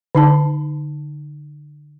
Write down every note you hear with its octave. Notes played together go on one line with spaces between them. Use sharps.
D3 D#4 A5